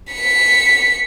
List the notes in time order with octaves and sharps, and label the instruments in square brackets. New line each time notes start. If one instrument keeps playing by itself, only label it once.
[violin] B6 C#7